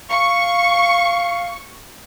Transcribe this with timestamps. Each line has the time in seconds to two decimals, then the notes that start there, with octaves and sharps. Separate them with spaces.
0.11 F5 C#6